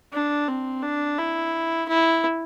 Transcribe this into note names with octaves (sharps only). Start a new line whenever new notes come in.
D4
C4
D4
E4
E4